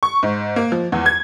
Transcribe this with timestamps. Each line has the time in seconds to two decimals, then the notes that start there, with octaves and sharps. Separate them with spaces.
0.03 C#6
0.23 G#2
0.56 A#3
0.72 F3
0.92 E2
1.06 G#6